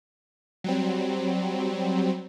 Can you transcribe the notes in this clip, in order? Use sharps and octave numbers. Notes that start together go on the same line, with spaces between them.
F#3 G3 C4